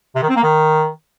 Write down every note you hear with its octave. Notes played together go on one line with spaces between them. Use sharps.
C3
D#3
C4
A#3
D#3